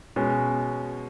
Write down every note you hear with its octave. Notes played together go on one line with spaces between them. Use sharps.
B2 G#3 C#4